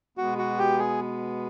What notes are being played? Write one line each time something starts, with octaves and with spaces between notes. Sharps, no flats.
B2 G#3 B3 F#4
F#4
G4
G#4